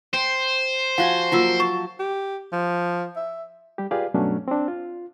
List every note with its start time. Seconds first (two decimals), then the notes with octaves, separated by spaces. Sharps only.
0.13 C5 G5
0.98 F3 F#4 F5 F#5 G#5
1.32 F3 F#3 A#3 D#4 F4 E6
1.60 A5 C#6
2.00 G4
2.53 F3
3.16 E5
3.78 G3 G4
3.91 F4 G4 G#4 B4 D5 F5
4.14 G2 B2 F#3 A3 C#4 D4
4.48 C4 D4
4.68 F4